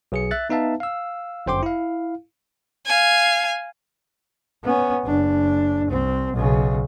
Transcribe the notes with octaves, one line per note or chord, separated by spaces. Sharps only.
B1 G#4 C#7
E5 F#6 A6
B3 D#4 B4 E5 F5 A5
F5 E6
G1 F#2 C5 G5 C6 D6
E4 F5
F5 G#5
B3 C#4
F#1 D4
C2 C4
B1 C#3